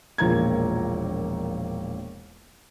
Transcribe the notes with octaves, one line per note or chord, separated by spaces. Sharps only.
E1 A#1 A#3 A#5 G#6